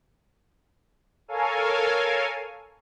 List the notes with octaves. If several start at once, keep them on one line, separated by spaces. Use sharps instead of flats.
A4 A#4 C#5 F5 G#5